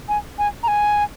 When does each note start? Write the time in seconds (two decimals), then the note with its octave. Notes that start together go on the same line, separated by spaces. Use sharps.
0.09 G#5
0.38 G#5
0.63 A#5
0.68 G#5